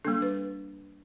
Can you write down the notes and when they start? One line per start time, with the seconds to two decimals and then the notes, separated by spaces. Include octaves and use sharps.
0.05 G3 A#3 D4 A4
0.22 B4